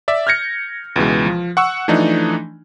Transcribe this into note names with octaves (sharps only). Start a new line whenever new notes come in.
D5 E5
F6 G6 G#6 A#6 C#7
C#2 B2 E3 G#3
F3
F#5 C#6 E6
E3 F3 A3 D4 D#4